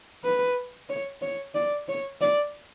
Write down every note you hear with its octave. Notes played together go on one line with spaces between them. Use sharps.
B4
C#5
C#5
D5
C#5
D5